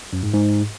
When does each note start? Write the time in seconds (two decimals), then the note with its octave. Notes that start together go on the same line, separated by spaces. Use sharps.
0.13 F#2
0.23 G#2
0.33 G#2